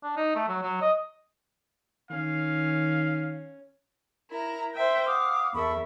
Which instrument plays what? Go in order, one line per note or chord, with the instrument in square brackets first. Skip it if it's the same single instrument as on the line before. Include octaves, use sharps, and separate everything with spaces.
[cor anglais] D4
D#4
A3
F#3
F#3
D#5
[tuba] D#3 [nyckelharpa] C#4 [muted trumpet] F5
[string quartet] E4 A#5 [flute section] A#4
[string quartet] C5 E5 G5
[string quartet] F5 [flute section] F#5 D6 D#6
[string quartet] E2 A#4 E5 [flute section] A4 B5 C#6